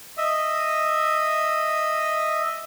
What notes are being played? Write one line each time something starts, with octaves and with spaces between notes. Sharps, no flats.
D#5 E5